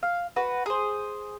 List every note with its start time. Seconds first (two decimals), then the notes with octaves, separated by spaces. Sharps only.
0.03 F5
0.36 F#4 B4
0.66 G#4 C5